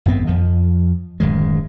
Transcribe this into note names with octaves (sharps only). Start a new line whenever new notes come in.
G#1 F#2 B3 C4
F2 F3
D1 F#2 D#3 G#3